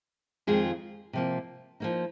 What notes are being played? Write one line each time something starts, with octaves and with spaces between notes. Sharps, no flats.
F2 D#3 G#3 F4 G#4
C3 F3 A#3
F3 A#3 D#4